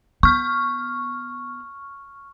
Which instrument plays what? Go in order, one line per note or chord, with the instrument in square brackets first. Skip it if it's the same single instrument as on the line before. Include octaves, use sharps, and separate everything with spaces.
[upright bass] B3 [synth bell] C#6 F6